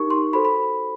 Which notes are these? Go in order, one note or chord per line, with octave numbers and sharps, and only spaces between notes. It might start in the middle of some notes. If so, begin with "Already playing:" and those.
Already playing: D#4 G4 A#4 C#6
C6
F#4 A4 C5 B5
B5